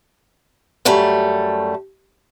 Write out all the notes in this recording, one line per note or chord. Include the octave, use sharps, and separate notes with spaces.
F#2 G3 A3